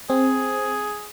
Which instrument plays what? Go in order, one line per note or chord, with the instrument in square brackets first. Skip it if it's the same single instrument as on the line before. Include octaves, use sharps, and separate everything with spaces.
[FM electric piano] C4 [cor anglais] G#4